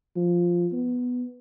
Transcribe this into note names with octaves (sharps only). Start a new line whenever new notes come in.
F3
B3